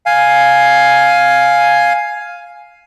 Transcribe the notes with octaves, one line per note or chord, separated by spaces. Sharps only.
F5 G#5